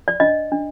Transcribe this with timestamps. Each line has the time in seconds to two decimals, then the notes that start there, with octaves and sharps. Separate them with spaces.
0.08 D5
0.20 D4 D#5
0.52 D4